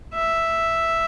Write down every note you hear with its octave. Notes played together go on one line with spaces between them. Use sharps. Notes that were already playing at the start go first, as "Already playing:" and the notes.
E5